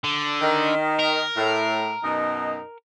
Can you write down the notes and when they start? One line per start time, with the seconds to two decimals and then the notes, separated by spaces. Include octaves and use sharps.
0.04 D3
0.41 D#3
0.99 A#4
1.37 A2
2.03 F#2 B2 D#4